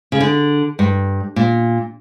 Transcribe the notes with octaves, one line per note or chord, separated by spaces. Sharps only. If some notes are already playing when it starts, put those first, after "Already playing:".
C#3
D3
G2
A#2